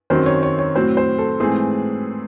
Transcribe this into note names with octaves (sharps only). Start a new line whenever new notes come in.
F#2 D#3 F#3 C4 C5
C#5
C#5
C#5
A2 F#3 C4 C5
C5
A4
G#2 E3 A3 C4 G#4